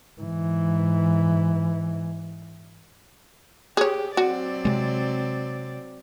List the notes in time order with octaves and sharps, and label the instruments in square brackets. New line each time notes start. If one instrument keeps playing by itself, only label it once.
[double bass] G#2 E3
[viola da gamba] G4 [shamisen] G#4 C#5
[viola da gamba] F#3 C4 D5 [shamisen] F#4
[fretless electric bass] C3 G#3